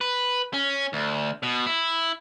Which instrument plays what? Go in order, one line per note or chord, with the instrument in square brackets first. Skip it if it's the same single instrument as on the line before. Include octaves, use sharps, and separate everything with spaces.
[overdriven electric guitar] B4
C#4
D2
B2
E4